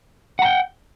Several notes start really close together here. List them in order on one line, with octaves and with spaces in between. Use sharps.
F#5 A#5 G5